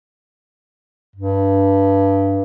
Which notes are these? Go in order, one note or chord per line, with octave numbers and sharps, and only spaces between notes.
G2